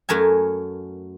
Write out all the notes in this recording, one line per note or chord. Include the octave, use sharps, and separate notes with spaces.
F#2 A3 A#4 G#5